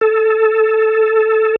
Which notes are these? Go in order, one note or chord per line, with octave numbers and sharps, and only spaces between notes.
A4